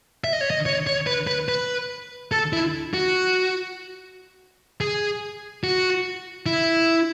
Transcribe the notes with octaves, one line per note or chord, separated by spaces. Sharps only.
E5
D#5
C#5
D#5
C#5
C#5
B4
B4
B4
A4
E4
F#4
G#4
F#4
E4